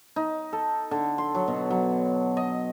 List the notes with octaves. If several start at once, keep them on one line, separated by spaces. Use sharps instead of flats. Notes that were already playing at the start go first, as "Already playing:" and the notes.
D#4
A4
D3
C6
F#3
B2
F#3
D#5